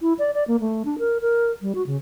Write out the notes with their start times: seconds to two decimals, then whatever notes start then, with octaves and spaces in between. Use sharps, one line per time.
0.02 E4
0.19 D5
0.34 D5
0.48 A#3
0.60 A3
0.85 D4
0.99 A#4
1.21 A#4
1.62 G3
1.75 F#4
1.87 C#3